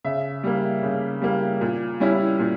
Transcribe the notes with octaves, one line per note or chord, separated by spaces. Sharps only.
C#3 E5
G3 A#3
C#3
G3 A#3
A#2
G3 C#4 E4
A#2